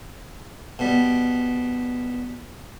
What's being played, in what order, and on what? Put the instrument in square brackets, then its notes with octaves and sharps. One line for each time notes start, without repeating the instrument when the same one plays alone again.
[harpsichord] B2 G3